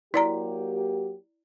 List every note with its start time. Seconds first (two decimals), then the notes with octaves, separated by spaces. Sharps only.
0.14 F#3 A#3 E4 G4 D5 A#5